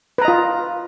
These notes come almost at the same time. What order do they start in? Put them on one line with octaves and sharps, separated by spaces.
B4 A#5 D#5 F4